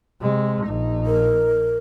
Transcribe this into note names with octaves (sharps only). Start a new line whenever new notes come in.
C3 G#3
A#1 D#4
A#4